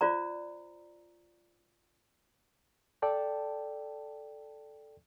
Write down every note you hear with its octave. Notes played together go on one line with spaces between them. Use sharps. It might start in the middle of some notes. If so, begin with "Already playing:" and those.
F4 C5 D5 A#5
A4 D5 G5 A5